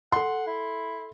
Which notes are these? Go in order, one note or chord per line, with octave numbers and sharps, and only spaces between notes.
A4 F#5 C6
E4